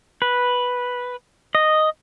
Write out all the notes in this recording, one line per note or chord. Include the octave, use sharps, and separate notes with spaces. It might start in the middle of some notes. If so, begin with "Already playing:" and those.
B4
D#5